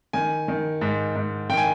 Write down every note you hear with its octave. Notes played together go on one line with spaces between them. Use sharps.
D#3 G#5
D#3
G#2
G#2
D#3 G5
G#5